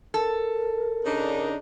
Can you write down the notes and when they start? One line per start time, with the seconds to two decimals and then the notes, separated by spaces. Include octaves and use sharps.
0.14 A4 A#4
1.05 C#3 D4 D#4